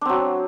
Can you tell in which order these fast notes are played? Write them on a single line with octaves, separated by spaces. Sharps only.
D4 C4 F#3